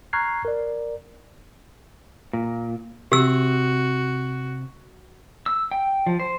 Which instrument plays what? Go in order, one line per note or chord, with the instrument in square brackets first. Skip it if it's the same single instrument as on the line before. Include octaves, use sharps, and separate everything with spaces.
[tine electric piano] A#5 C#6 F6 F#6 G#6 C7
A#4 D5
[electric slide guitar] A#2
[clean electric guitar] C3 [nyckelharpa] F#4 [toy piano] G4 E6
[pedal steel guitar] E6
G5
F3
C5